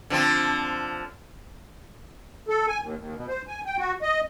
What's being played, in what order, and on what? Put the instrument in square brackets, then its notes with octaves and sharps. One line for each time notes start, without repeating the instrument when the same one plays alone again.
[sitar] D3 F3 C4
[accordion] A4
G#5
D#2
D#2
B2
C5
G#5
G5
F#4
D#5